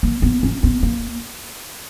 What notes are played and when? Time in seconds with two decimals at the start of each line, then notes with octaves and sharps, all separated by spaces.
0.03 A#3
0.22 B3
0.43 C#4
0.63 B3
0.83 A#3